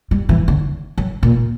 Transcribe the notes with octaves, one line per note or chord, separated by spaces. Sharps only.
G3
E3
D3
F#3
A#2